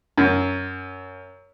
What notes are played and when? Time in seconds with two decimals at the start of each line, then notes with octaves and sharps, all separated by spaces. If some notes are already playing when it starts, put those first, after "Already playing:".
0.17 F#2